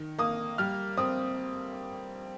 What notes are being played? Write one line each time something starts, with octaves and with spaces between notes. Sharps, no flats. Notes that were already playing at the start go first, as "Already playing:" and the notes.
Already playing: D#3
A#3 D#6
G3 F6
C4 D#6